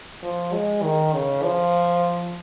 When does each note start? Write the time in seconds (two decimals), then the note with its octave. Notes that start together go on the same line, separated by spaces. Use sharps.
0.23 F3
0.53 G#3
0.83 D#3
1.13 C#3
1.43 F3